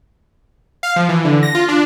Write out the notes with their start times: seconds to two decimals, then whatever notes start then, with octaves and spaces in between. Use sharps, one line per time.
0.83 F5
0.96 F3
1.09 E3
1.25 D3
1.43 A#6
1.55 F4
1.68 D4